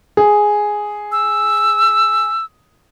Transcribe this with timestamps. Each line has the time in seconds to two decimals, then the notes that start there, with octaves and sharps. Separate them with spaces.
0.17 G#4
1.12 E6